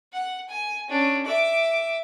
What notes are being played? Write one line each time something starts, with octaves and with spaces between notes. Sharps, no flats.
F#5
G#5
C#4 D4
E5 D6